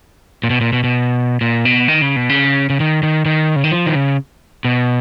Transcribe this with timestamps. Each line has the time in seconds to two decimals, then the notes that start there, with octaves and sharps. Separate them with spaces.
0.44 A#2
0.50 B2
0.61 A#2
0.73 B2
0.84 B2
1.41 A#2
1.65 B2
1.88 D#3
2.02 C#3
2.16 B2
2.29 C#3
2.70 C#3
2.80 D#3
3.03 D#3
3.25 D#3
3.56 C#3
3.64 D#3
3.72 F3
3.86 D#3
3.95 C#3
4.65 B2